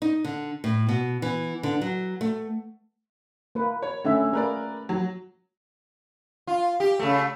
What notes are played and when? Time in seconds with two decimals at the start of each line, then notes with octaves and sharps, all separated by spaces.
0.02 D#4
0.24 D3
0.64 A2
0.89 B2
1.22 E3
1.63 D3
1.81 F#3
2.21 A3
3.55 A#3 B4
3.82 C#5
4.05 D3 A3 C#4 E5
4.33 A#3 G#4 A#4 B4 D5
4.89 F#3
6.47 F4
6.80 G4
6.99 C#3 A3